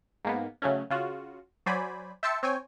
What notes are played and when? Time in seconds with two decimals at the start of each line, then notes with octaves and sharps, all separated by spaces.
0.25 G#2 A#3 B3
0.62 C#3 F#3 A3 C#4
0.90 C#3 F4 F#4
1.66 F#3 C5 D5 G#5 B5
2.23 E5 G5 A5 C6 E6 C#7
2.43 C4 C#5 G5 G#5